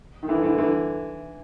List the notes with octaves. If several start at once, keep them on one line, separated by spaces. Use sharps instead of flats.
D#3
D3 E3
D3 E3
D3 E3